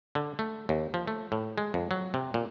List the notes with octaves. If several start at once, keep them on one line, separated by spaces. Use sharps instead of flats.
D3
A3
D#2
F3
A3
A2
G#3
F2
F#3
C3
A#2